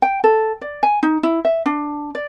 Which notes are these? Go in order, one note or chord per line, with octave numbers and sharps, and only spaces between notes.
G5
A4
D5
G#5
D#4
E4
E5
D4
D5